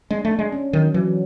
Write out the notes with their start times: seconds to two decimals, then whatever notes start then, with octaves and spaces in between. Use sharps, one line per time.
0.10 G#3 D4
0.25 A3
0.31 D4
0.39 G#3
0.52 C#4
0.73 D#3 F#3
0.94 E3 F#3